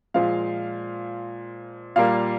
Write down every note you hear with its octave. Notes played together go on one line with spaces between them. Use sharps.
A#2 F3 G#3 F5
A#2 G3 A#3 F5